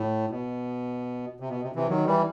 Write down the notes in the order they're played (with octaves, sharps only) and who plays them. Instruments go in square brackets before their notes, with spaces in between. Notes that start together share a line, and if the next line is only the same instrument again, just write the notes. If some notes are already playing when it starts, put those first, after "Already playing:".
Already playing: [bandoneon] A2
B2
C3
B2
C3
C3 E3
D#3 F#3
E3 G3